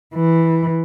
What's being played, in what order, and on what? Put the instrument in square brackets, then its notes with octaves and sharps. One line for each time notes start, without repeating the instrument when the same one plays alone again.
[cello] E3